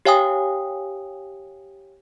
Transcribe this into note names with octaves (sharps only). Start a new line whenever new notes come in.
G4 C#5 F5 G5 G#5 D#6